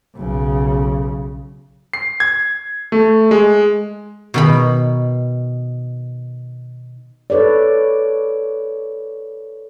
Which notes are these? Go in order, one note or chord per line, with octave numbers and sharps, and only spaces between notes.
B1 C#3
C7
G#6
A3
G#3
B2 D#3 B5
D#4 A4 B4 C#5 D5